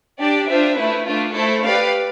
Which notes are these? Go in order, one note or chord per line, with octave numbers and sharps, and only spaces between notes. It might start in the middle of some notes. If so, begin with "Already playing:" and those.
D4 G4 D5
D4 F4 C5 E5
A3 E4 B4
A3 D4 F4
A3 E4 A4 C5
G4 B4 D5 F5